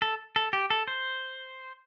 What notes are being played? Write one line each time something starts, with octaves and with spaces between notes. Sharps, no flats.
A4
A4
G4
A4
C5